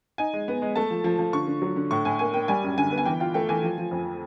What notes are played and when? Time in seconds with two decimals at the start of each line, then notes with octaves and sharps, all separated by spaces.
0.18 D#4 G#5
0.34 G#3
0.48 B3
0.62 G#3
0.76 A3 A5
0.91 F3
1.04 F3
1.19 F3
1.33 D3 C#6
1.47 D3
1.62 F#3
1.76 D3
1.91 A2 C#6
2.05 A2 G#5
2.19 A#3 G#5
2.34 A#3 G5
2.48 G3 G#5
2.63 F#2
2.78 D3 G#5
2.91 B3
2.98 G#5
3.06 E3 G5
3.20 F4 G5
3.34 A3 G5
3.49 E3 G#5
3.63 F3
3.78 F3
3.91 F2